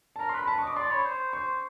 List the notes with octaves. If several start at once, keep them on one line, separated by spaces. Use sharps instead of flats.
A5
A#4 A#5
C6
B4
B5
A5
C#6
D#5
D6
D5 C6
C#5 B5
C5
C5 C#6